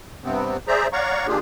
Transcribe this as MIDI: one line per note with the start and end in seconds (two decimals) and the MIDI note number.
0.24 0.57 43
0.24 0.57 48
0.24 0.57 59
0.24 0.57 60
0.68 0.87 68
0.68 0.87 72
0.68 0.87 74
0.68 0.87 76
0.68 0.87 82
0.93 1.27 73
0.93 1.27 74
0.93 1.27 77
0.93 1.27 78
0.93 1.27 82
0.93 1.27 85
1.27 1.39 51
1.27 1.39 58
1.27 1.39 62
1.27 1.39 65
1.27 1.39 67
1.27 1.39 68